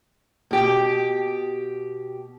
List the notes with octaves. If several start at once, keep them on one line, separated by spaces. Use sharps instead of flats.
B2 G4